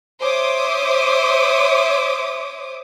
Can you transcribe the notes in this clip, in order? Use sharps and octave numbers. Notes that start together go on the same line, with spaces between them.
C5 C#5 E5 D6 D#6